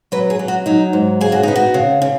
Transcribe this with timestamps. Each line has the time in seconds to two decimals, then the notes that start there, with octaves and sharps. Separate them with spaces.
0.12 F#3 B4
0.30 G#4
0.39 F#3
0.48 F#4
0.66 F#3 D#4
0.93 G#2
1.21 C#3 G#4
1.32 F#4
1.43 B3 D#4
1.56 F#4
1.74 C#3
2.02 C#3